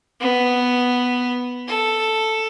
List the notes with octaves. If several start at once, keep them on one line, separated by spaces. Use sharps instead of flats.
B3
A4